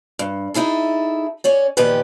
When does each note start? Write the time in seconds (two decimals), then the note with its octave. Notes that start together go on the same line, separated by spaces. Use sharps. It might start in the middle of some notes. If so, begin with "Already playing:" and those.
0.19 G2
0.54 D#4 E4 G#4 A4
1.44 C#4 C#5 D5
1.77 E2 A#2 D#3 F3 G4 B4